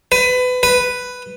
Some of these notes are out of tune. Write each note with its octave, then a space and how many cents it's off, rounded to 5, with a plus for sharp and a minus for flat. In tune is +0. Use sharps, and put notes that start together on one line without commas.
B4 +25
B4 +5